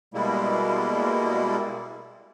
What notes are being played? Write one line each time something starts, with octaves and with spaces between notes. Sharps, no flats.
B2 G3 G#3 A#3 E4